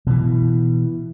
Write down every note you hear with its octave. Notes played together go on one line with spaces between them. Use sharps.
B2 E3